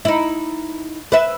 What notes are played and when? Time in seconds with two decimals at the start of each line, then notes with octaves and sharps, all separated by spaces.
0.05 D#4 E4
1.12 B4 E5